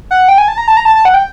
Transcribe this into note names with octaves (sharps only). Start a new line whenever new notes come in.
F#5
G5
G#5
A5
A#5
A5
A#5
A5
A5
F#5
G5